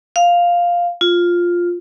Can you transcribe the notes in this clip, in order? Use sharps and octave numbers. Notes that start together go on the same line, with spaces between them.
F5
F4